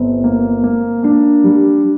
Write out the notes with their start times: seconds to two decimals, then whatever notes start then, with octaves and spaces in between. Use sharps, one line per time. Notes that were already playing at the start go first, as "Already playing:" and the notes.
Already playing: G1 C4
0.24 A#3
0.64 A#3
1.03 A#3 D4
1.44 G3